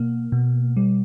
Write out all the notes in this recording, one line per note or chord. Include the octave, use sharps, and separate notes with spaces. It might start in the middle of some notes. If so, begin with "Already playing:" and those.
Already playing: B2 A#3
B2
G3